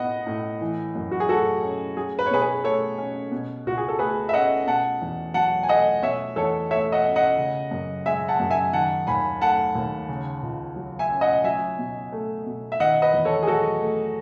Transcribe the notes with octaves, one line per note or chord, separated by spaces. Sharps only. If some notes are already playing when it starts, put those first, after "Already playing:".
Already playing: A2 B3 D#5 F#5
A2
E3
F#2
F#4
G#4
A3 F#4 A4
C#4
F#3 G#4
B4
C#5
B2 G#4 B4
G#4 B4
A3 A4 C#5
C#4
B2
C#2 F#4
G#4
A4
A3 G#4 B4
E5
C#4 D#5 F#5
B2 F#5 A5
E2
F#3 F#5 A5
G#5
A3 D#5 F#5
B2 C#5 E5
E2 A4 C#5
A3 C#5 E5
D#5 F#5
C#4
D#5 F#5
C#3
F#2
G#3 E5 G#5
F#5 A5
F#2
E5 G#5
D#3 F#5 A5
D#2 G#5 B5
A3 F#5 A5
D#2
C#3
C#2
F#3
E5 G#5
C#4
D#5 F#5
F#3 E5 G#5
B2
A3
B2
E5
D#3 D#5 F#5
B4 D#5
E2
A4 C#5
G#4
F#3 F#4 A4
A3